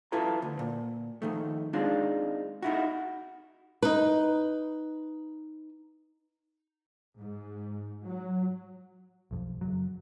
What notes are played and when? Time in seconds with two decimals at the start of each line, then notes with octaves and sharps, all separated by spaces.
0.12 E4 F4 A4 B4 A#5
0.42 D2
0.59 A#2
1.22 F2 D#3 A3
1.73 G#3 C4 D4 D#4 F4
2.62 D#4 E4 F#4
3.83 D#4 B4
7.19 G#2
8.06 F#3
9.31 B1 F2
9.61 F#1 B1 F#3